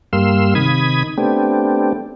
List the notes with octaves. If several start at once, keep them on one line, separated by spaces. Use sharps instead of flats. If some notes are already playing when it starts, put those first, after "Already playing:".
G2 G3 A#3 F5 C6 E6
C3 D#3 B5 D#6 G#6
A3 B3 C4 D4 G4